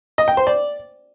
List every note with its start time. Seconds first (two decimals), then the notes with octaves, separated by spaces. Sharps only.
0.18 D#5
0.28 G5
0.37 C5
0.47 D5